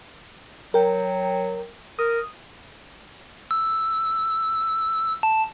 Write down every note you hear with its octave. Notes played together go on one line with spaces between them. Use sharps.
F#3 A#4 G5
A#4 D#6
E6
A5